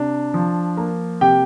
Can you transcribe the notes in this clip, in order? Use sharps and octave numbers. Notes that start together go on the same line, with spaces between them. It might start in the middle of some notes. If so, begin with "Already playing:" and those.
Already playing: C3 D4
F3
A#3
C3 G4 G5